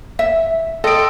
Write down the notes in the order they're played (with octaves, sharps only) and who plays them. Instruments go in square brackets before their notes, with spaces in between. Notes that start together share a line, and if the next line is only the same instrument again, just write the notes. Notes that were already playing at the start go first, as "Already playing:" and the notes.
[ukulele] E5
[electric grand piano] A4 D7 [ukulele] D#5 [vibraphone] G5 C6 D#6